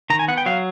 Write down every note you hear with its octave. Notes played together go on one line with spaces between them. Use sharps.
D#3 A#5
G#5
B3 F#5
G5
F#3 F5